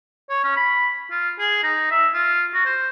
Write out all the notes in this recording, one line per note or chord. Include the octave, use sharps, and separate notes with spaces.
C#5
C#4
B5
F4
G#4
D#4
E5
F4
F#4
C5